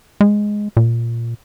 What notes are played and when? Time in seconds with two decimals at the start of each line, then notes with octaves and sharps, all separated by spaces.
0.21 G#3
0.77 A#2